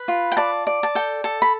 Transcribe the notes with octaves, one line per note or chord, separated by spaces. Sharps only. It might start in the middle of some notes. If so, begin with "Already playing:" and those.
Already playing: B4 B5
F4
G5
D5 A5
D5
A5
A4 G5
A4
B5